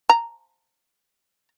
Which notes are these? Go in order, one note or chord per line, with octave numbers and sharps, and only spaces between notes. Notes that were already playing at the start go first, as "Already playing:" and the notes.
A#5